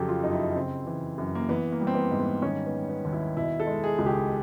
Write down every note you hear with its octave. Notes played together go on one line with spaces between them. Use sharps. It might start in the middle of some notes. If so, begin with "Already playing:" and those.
Already playing: F2 C#3 F#3 G4 A4
F4
F#2 D#4
E4
C#3 C4
E3
F#2
A#3
E3 B3
A#3
G3
C4
B3
G#2
B3
D#3 C#4
B3
G3
B3
D#2
E4
B2 E4
A4
G#3
G#4
C#2
G4